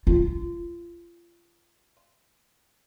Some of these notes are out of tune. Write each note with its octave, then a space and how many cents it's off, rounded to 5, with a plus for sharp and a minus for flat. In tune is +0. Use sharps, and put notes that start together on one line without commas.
F4 -30